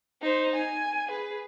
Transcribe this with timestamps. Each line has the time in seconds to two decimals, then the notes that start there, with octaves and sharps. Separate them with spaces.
0.21 D#4 C5
0.56 G#5
1.07 G#4 B4